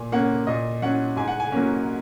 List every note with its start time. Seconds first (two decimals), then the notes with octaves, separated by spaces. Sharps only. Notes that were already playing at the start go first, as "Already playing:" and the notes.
Already playing: A#2 G#5
0.12 A#3 C#4 F#5
0.47 A#2 D#5
0.82 F#3 C#4 F#5
1.16 G#2 G#5
1.28 F#5
1.40 G#5
1.52 F#3 A#3 C#4